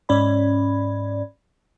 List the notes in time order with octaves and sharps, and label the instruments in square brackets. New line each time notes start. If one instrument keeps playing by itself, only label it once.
[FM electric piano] G#2 C#4 D5 B5